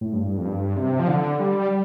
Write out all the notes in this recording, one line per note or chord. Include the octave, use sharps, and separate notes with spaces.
A2
G2
F2
G2
C3
F3
D3
G3